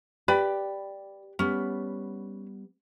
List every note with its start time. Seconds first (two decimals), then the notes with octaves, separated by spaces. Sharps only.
0.28 G4 B4 D5 B5
1.39 G3 B3 C#4